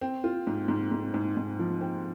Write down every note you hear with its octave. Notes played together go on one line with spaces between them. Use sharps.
C4
F4
G#2
G#2
G#2
G#2
G#2
F3
C4